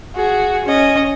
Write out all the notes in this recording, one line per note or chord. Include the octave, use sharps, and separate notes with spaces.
F#4 G#4
C#4 D#5